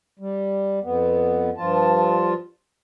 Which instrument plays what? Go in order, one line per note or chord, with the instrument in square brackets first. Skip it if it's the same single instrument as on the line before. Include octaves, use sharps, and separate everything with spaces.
[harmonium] G3
F2 B3
G2 F3 F4 A5